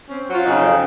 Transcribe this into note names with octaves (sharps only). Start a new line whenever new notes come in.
C4 C#4
F#3
F4
C#3 D#4
F2